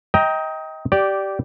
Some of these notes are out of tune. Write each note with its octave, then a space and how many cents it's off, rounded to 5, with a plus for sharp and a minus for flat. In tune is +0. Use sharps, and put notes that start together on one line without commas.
D#5 +25 G5 +0 A#5 +0
G4 -15 D5 +0